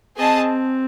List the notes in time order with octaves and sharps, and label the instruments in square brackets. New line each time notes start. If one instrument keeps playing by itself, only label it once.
[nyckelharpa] C4 [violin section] G#4 D#5 A5